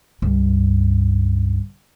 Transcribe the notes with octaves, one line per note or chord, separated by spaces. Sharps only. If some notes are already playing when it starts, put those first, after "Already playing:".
C#2 G2